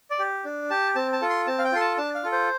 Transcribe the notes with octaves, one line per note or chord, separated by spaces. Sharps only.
D5
G4
D4
G4 A5
C4 A5
A5
F4 A4
C6
C4 A5
F5
G5
F4 A4 C6
A5
D4 A5
F5
F4 A4
C5